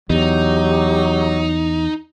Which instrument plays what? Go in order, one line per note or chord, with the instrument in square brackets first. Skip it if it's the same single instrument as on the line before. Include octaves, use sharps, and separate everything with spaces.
[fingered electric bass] E2 [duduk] F#3 [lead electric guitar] D#4 [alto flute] G4